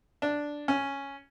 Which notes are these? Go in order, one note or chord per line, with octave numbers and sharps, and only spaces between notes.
D4
C#4